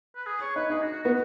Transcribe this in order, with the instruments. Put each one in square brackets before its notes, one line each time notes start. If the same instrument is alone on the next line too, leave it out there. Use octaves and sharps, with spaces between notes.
[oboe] B4
G#4
C#5
[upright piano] D#4 [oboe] B4
[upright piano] D#4 [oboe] G#4
[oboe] F#4
F#4
[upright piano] B3 [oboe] F#4